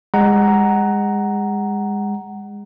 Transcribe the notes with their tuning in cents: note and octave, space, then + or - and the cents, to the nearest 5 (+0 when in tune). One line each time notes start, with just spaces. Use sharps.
G#3 -30 F#5 +15 A#5 +0